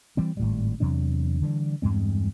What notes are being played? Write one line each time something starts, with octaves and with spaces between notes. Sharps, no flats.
E3 G3 C4
G#1 A2 G3
E2 C3 F#3 D4
D3 E3 G3
E2 G2 G#3 C4